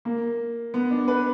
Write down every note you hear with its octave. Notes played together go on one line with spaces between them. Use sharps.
A#3
B3
D4
B4